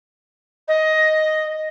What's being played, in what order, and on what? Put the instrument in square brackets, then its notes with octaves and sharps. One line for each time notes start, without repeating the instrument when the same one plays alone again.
[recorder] D#5